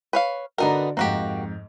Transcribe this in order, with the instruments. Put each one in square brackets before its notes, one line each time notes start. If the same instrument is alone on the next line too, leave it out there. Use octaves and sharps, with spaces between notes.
[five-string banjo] B4 C#5 F5
[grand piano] D3 D4 F#4 [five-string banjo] B3 D#4 A#4
[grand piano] F2 G#2 [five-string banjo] A#3 F#4 G4